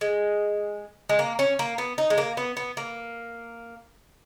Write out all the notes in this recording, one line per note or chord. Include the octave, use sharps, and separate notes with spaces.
G#3
G#3
A#3
C#4
A#3
B3
D#4
G#3
A#3
B3
B3
A#3